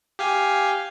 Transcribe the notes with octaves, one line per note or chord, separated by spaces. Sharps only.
G4 F5 G#5